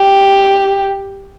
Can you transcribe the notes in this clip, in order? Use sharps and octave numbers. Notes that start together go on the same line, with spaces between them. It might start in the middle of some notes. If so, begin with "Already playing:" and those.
Already playing: G4